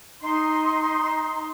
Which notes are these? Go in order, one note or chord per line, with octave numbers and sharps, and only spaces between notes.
D#4 C6